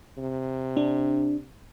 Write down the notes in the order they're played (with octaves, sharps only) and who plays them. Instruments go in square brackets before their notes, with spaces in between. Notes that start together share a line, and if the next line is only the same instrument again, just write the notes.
[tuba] C3
[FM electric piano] D4